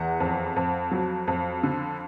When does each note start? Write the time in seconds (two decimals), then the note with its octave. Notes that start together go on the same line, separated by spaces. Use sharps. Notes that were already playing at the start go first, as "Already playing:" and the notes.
Already playing: E2 F#5
0.20 F2
0.56 F2
0.92 F#3
1.27 F2
1.63 D3